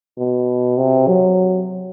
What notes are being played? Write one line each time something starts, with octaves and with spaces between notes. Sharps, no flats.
B2
C3
F#3